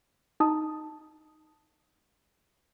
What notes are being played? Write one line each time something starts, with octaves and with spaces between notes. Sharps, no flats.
D#4 A5 D#6